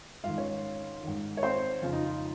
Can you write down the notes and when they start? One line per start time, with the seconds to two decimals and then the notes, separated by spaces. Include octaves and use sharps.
0.24 G#2 D#3 F4 F5
0.37 C#4 C#5
1.03 G#2 D#3
1.37 C#5
1.43 C4 C5
1.82 F2 C#3 F4
1.93 D#4
2.04 F4